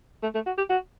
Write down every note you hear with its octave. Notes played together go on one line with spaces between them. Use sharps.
A3
A3
F#4
G4
F#4